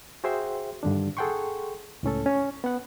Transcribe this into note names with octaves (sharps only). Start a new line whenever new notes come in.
F#4 G#4 C5 E5 G5 C6
G2 D3 D#3 D4
G#4 A4 F#5 G5 C6 C#6
C#2 A2 C#4 A4
C#4
B3 F#5